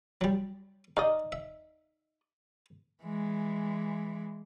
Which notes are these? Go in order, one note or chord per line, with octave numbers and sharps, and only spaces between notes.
F#3 G3
D#4 D5 D#5 F5
E5
E3 G#3